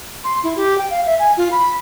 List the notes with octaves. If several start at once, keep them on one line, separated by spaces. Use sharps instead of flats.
C6
E4
G4
G5
F5
E5
G#5
F4
B5